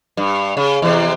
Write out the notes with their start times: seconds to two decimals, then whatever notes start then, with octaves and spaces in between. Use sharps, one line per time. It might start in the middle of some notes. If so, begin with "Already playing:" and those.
0.17 G2
0.57 C#3
0.82 E2 C3